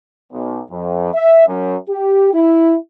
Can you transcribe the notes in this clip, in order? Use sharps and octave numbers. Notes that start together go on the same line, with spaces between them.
B1
F2
E5
F#2
G4
E4